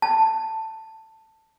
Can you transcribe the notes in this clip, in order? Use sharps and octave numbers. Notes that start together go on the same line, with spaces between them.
A5